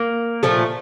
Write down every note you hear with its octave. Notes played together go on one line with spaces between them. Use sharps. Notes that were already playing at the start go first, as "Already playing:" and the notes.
Already playing: A#3
A#2 F3 A3